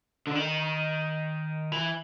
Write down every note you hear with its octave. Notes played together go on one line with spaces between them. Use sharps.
D3
D#3
E3